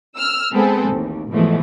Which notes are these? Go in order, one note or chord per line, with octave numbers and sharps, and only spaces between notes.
E6 F6
G#3 B3 C4 G#4 A4
A1 D#2
G#2 B2 E3 F3 G#3 A3